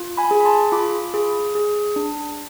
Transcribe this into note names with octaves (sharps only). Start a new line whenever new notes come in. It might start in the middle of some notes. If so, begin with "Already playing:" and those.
Already playing: F4
G#5 B5
G#4
B5
A5 C6
F4 B5 D6
G#4
G#4
D4